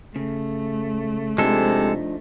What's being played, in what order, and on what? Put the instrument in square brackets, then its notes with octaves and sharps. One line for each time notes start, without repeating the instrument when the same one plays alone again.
[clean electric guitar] C#3 [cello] A3
[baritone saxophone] C3 [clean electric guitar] F3 D4 D#4 [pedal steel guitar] G#3 A4